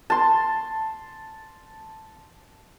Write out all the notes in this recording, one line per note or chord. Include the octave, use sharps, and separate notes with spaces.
A5 C6